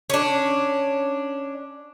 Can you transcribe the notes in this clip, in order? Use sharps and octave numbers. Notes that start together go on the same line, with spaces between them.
C#4 D4